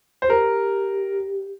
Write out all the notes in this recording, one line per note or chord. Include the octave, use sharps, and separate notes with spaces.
C5
G4 A#4